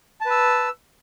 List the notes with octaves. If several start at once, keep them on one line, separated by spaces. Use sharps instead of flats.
B4 A5 E6